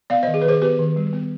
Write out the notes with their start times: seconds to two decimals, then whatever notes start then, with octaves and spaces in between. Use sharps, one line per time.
0.10 B3 D5 F5
0.23 D#3 C5 D#5
0.34 G#4
0.42 B4
0.44 D#3 G#4 C5
0.62 B3 G4 B4
0.79 D#3
0.96 G3
1.13 B3